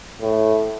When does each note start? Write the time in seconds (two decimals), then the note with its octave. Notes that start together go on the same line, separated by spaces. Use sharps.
0.21 A2